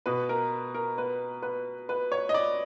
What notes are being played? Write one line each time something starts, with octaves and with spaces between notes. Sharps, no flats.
B2 B4
A#4
A#4
B4
B4
B4
C#5
D#5
D5